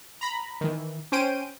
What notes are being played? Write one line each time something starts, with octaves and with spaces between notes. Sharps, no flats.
A#5 B5
D#3 E3
C#4 C5 G5 D7 D#7